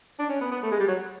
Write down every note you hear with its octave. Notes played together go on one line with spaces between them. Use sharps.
D4
C#4
B3
B3
A3
G#3
G3
F#3